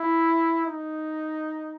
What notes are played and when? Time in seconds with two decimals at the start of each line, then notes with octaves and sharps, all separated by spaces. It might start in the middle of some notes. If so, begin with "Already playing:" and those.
Already playing: E4
0.66 D#4